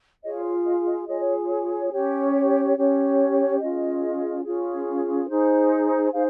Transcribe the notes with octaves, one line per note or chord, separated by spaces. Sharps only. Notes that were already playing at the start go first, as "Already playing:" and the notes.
F4 G#4 C#5 D#5
C#5
D#5
D#5
F4 G#4 C#5 D#5
C#5
C#5
C#4 G4 C#5
C#4 G4 C#5
C#4 F4 G#4 D#5
C#4 F4 G#4
D#4 G#4 C5
D#4 G#4 C5 F5